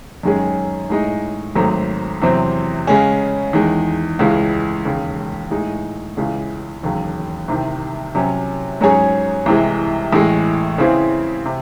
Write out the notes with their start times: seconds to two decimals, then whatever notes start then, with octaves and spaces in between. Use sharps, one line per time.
0.23 F#2 D#3 G#3 C#4 G#4
0.90 A2 G#3 D#4
1.56 G#1 G#2 F#3 A3 C4
2.22 E2 C3 F#3 C4
2.87 C#3 G#3 C#4
3.53 E2 D#3 G#3
4.19 C#2 C#3 E3 G#3
4.85 E1 D#2 C#3
5.51 A2 G#3 D#4
6.17 C#2 C#3 E3 G#3
6.83 E1 D#2 C#3 F#3
7.48 C2 C3 D#3
8.15 C3 F#3 C#4
8.81 G#2 F#3 C#4 G#4 C#5
9.46 C2 C3 E3 G#3
10.13 A1 A2 G#3
10.78 C#3 E3 C4 E4 G#4
11.46 C3